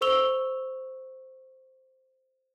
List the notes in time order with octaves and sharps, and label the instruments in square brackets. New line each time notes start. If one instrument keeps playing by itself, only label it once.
[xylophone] A4 C5 C#6 E6 F7 G7